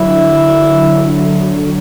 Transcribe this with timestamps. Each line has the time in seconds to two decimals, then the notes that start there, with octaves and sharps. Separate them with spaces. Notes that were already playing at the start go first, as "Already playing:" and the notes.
Already playing: D3 F#3 E4